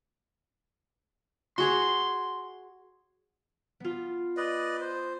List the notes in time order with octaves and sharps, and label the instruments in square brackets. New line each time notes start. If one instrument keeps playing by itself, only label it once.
[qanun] F#4 G#4 C#5 [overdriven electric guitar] C6
[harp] B3 F4
[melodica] B4 D5 D#5
C5